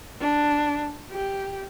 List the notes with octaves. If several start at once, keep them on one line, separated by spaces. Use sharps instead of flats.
D4
G4